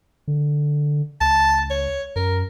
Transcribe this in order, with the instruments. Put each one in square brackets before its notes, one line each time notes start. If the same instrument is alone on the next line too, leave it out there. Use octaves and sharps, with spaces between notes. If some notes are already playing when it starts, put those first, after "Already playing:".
[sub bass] D3
[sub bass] C#2 [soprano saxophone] A5
[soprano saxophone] C#5
[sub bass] F#2 [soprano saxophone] A#4